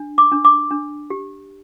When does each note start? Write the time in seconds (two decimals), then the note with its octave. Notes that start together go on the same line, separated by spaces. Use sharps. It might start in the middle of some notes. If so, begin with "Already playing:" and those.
Already playing: D4
0.18 D6
0.32 D4
0.45 D6
0.70 D4
1.10 G4